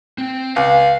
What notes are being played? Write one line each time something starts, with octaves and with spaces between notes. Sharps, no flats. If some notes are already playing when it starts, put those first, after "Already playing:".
C4
C#2 F5